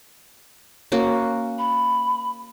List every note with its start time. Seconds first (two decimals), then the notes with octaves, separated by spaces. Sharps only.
0.92 A#3 C#4 F#4
1.58 B5